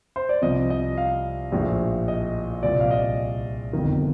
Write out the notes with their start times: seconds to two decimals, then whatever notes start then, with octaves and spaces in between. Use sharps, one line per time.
0.16 C5
0.29 D5
0.42 C2 C3 F3 D#5
0.70 D#5
0.97 F5
1.52 A#1 A2 F3
2.08 D#5
2.62 C2 A#2 F3 D5
2.80 F5
2.91 D#5
3.73 G1 F2 D#3